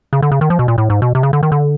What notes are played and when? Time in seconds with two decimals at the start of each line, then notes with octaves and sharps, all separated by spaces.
0.13 C#3
0.22 D3
0.32 C#3
0.41 D#3
0.50 F3
0.59 B2
0.68 A#2
0.78 A2
0.90 G#2
1.02 B2
1.15 C3
1.23 C#3
1.33 D3
1.43 D#3
1.52 D3